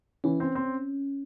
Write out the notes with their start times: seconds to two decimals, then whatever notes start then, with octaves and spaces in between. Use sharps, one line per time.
0.24 E3 C#4
0.40 C4
0.55 C4